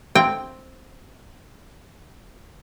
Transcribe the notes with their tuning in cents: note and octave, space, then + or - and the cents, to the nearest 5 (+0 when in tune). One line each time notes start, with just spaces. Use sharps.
C4 +0 G5 +0